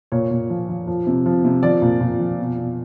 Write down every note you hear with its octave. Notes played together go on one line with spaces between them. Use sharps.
A#2 C#5
A#2
F3
F3
F3
C3
F3
C3
F3 D5
A#2
A#2
F3
B2
B2